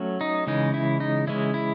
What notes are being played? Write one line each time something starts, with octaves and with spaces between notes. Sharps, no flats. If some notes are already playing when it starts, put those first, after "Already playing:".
Already playing: F#3 A3 C#4
D#4
C#3 E3 G#3 C#4 D#4
E4
D#4
C#3 E3 G#3 C#4 E4
E4